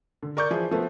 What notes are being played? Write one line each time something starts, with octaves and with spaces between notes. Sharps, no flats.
D3
A#4 D5 C#6 D6 G6
E3 F3 E4 G#4
F3 A3 B3